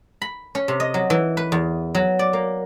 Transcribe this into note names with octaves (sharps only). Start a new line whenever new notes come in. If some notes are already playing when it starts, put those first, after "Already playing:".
B5
C#4
C3
D#5
F#3
E3
B4
E2
F#3
D5
A#3